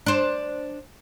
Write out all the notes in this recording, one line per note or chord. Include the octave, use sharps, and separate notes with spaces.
D4 C5